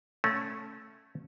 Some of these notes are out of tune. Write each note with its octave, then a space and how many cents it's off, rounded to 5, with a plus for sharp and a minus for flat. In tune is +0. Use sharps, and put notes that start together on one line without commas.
A3 +0 C#4 -10